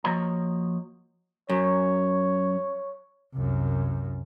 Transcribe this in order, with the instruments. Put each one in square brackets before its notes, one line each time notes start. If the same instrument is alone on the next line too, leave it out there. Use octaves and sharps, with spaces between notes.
[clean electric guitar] F3 A#3 F#4 C#5 D#5 A#5
[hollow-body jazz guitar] F#2 [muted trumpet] C#5
[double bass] C2 F#2